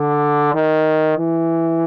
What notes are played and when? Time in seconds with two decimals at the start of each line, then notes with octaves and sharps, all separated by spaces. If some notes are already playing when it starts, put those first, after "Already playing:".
Already playing: D3
0.54 D#3
1.18 E3